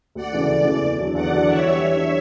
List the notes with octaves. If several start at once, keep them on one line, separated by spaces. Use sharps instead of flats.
D2 D5 F#5
C#3 E3 A3
D2
C#3 E3 A3
E2
D3 F#3
E2 D5 F#5
D3 F#3
E3 C#5 E5
G3 D4
E3 C#5 E5
G3 D4